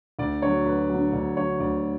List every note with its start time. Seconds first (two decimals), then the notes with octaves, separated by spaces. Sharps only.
0.19 D2 D5
0.42 D3 F#3 C#5
0.66 D2 B4
0.90 D3 F#3
1.13 D2 D5
1.37 D3 F#3 C#5
1.60 D2 D5